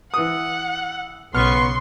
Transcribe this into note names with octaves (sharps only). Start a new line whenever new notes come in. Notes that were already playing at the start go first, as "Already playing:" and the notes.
E3 F#5 D#6
B1 C#3 B3 C6 C#6 F6